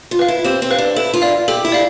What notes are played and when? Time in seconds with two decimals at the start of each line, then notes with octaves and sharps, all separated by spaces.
0.11 F4
0.19 B4 F5
0.28 E4
0.44 C4 G4
0.62 C4
0.71 B4 F5
0.78 D4
0.96 E4 A4
1.14 F4
1.22 D5 F5
1.48 G4 A4
1.65 E4
1.72 D5 F5